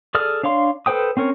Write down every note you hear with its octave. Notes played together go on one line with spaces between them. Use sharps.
G#4 A4 D5 D#6 F6
D4 C#5 F5 C6
A4 B4 C5 G5 D#6
C4 C#4 A#4 C#5